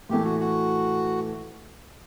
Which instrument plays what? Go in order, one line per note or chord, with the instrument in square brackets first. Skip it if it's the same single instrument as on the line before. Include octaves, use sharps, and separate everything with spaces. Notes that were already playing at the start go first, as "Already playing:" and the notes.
[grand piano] A2 E3 A3 [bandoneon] G4
[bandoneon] F#4
F#4